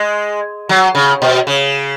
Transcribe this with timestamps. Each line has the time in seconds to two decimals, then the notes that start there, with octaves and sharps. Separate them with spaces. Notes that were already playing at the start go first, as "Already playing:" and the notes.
Already playing: G#3
0.69 F#3
0.95 C#3
1.22 B2
1.47 C#3